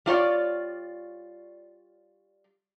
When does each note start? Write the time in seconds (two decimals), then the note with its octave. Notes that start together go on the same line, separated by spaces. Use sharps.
0.06 G3 F4 C#5 D5